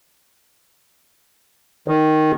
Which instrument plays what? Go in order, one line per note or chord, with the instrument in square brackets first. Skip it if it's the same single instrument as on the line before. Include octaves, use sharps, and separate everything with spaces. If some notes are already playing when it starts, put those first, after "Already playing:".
[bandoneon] D#3